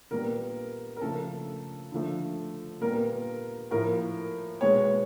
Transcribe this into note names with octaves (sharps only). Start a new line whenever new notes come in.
A#2 G3 B3 A#4
A#4
C#3 F3 A3 A4
D3 F3 A3
A#2 G3 B3 A#4
A2 F3 A#3 A#4
B2 G#3 B3 C#5